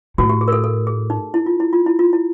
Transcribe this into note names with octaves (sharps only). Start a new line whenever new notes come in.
A2 F#4
G4
G#4
A#4
A4
A4
G#4
D#4
E4
F4
E4
F4
E4
F4
E4